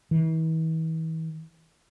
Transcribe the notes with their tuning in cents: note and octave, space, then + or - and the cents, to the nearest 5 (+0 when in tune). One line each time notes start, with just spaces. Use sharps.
E3 -40